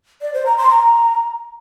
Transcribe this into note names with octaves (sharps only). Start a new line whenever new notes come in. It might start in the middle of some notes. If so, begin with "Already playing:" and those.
D5
C5
A#5
C6
A#5